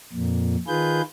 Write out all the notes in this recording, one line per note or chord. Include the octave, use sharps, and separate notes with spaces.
F2 A#2
D#3 F4 G#4 B4 G6